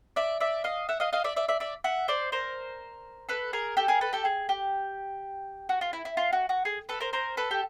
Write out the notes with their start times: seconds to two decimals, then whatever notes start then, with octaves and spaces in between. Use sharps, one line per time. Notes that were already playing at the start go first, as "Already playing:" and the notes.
0.16 D5 E5
0.40 D5 E5
0.64 D#5 F5
0.89 E5 F#5
1.00 D#5 F5
1.13 D#5 F5
1.24 D5 E5
1.36 D5 E5
1.48 D5 E5
1.60 D5 E5
1.84 E5 F#5
2.08 C5 D5
2.32 A#4 C5
3.29 A4 B4
3.53 G#4 A#4
3.77 G4 A4
3.88 G#4 A#4
4.01 A4 B4
4.13 G4 A4
4.25 G#4
4.49 G4
5.69 F#4
5.81 F4
5.93 E4
6.05 E4
6.17 F4
6.33 F#4
6.49 F#4
6.65 G#4
6.89 A4 B4
7.00 A#4 C5
7.13 A#4 C5
7.37 A4 B4
7.51 G4